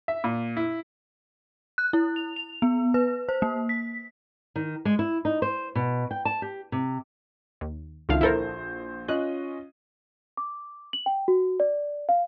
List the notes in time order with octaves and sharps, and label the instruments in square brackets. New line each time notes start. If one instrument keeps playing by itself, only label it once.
[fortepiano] E5
A#2
E4
[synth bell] F#6
E4
F7
F7
B3
B4
C5
A#3
B6
[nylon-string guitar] D#3
G#3
E4
D#4
C5
B2
G5
A5
G4
C3
[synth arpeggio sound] D#2
[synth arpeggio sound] C#2 D3 F5 [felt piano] D#3 E4 F4
[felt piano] A#1 C5 [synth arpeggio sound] E4 A4 A#4
[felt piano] C#4 F4 D#5 [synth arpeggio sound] F#6
[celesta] D6
F#7
G5
F#4
D5
F5